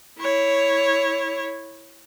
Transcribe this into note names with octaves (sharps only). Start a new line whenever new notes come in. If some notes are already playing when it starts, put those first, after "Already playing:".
E4 C#5